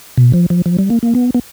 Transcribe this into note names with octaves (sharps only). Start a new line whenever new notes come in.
B2
F3
F3
F3
G3
A#3
A#3
B3
B3